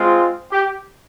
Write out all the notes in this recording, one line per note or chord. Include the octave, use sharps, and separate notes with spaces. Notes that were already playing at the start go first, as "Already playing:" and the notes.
Already playing: G#3 C4 F4
G4